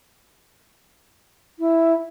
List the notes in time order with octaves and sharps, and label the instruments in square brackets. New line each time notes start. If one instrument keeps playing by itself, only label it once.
[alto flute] E4